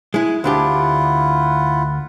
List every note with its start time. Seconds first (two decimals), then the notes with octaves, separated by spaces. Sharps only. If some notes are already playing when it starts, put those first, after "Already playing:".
0.14 G#3 E4 G#5 F#6
0.44 D2 D4 E4 F4 G4 F#5